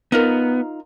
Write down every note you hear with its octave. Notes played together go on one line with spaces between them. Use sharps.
B3 D#4 F4 A#4